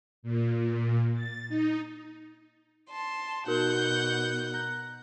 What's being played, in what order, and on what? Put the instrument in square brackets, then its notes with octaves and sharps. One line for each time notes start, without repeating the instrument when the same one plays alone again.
[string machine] A#2
A6
D#4
[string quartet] A5 C6
[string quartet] B2 F#5 G6 [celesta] D#4 F#4 A#4
[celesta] A#5 F#6 A#6